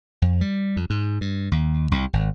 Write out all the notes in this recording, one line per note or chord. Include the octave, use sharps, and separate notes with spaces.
F2
G3
F2
G#2
G2
D#2
C2
G#1